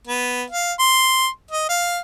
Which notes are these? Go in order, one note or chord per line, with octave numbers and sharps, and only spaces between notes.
B3
F5
C6
D#5
F5